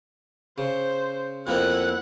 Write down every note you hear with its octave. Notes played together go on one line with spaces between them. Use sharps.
C#3 C5
F2 A#3 B3 E4 F#5